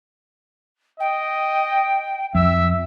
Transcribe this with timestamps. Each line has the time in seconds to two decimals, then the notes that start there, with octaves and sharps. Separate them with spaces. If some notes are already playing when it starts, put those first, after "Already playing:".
1.00 D#5 G5
2.35 F2 E5 E6